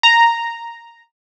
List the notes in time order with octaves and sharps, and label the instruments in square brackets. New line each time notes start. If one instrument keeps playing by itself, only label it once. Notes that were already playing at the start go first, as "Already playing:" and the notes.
[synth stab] A#5